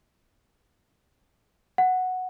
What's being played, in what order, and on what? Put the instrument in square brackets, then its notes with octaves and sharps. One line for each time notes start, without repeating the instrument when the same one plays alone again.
[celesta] F#5